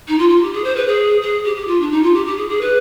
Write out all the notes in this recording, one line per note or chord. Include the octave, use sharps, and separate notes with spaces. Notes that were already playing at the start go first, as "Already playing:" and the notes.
D#4
F4
F4
G4
G#4
C5
B4
G#4
G#4
G4
G4
F4
D4
D#4
F4
G4
G4
G#4
G#4
B4